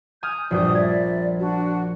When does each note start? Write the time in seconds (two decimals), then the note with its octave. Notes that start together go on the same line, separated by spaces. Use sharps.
0.23 G#5 D#6 F6 G6
0.51 A#1 G2 F#4 D5 D#6 G6
0.75 D5 E5 G#6
1.39 D4 F#4